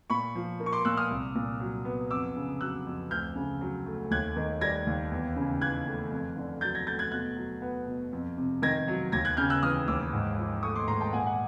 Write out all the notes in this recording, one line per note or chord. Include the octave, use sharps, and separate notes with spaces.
A#2 B5 C#6
F3
A#3
C#6
C6 D6
A#2 E6 F#6
D#6 F6
C2
A#2
F#3
B3
F2 D6 E6
C#3
F#3 E6 F#6
F2
D2 F6 G6
C#3
F#3
A3
D#2 F#6 G#6
D#3
G3 G#6 A#6
D#2
E2
C#3
E3 F#6 G#6
A3
F2
D3
F#3 G6 A6
G#6 A#6
A3 G6 A6
F#6 G#6
B2 F#6 G#6
F#3
B3
B2
F2
C3
D#3 G#6 A#6
F#3
D#2 G#6 A#6
F#6 G#6
C#3 F6 G6
E6 F#6
E3 D#6 F6
D#2 D6 E6
G#2
F3
A3 C#6 D#6
C6 D6
G#2 A#5 C6
G5 A5
A#2 F#5 G#5
F#5